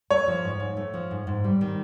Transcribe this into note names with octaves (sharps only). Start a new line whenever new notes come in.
A3 C#5
F3
G#2
G#2
A3
F3
G#2
G#2
G3
D#3